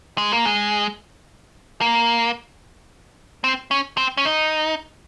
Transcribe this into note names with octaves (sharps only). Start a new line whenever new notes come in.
G#3
A#3
G#3
A#3
C4
C#4
C4
C#4
D#4